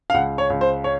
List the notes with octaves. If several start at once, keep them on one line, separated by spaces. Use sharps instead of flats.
F5
C#2 F#5
C#5
C#2
C5
C#5